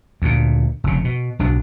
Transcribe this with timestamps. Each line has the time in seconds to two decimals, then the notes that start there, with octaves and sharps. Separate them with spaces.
0.22 D2 A#2
0.84 F1 C#3
1.04 B2
1.39 B1 B2 D4